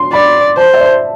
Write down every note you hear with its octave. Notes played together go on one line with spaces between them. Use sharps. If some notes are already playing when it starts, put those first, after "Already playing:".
Already playing: C6
D5 B5
C5 A5
E5
D5